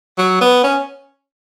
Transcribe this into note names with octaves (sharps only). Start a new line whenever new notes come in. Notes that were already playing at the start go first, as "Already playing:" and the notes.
F#3
B3
C#4